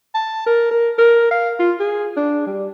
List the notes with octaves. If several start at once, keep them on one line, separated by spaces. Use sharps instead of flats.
A5
A#4
A#4
A#4
F5
F4
G#4
D4
G3